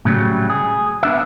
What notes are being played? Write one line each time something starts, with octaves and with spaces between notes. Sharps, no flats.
A2 C#3 F#3 G3
G#4
B3 D4 E5